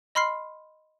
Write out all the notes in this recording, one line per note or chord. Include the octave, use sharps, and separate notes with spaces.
D#5 B5 C6 F6 C7